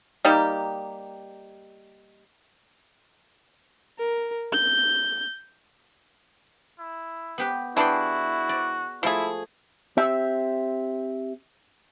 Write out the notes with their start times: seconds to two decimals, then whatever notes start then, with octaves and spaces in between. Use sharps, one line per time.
0.25 G3 A#3 D#4 G4
3.98 A#4
4.53 G6
6.79 E4
7.38 B3 G4 B4
7.77 E3 D4 E4 F#4 G#4 F#5 G5
8.49 D5
9.03 F3 A3 E4 G#4 C6
9.97 C4 G4 E5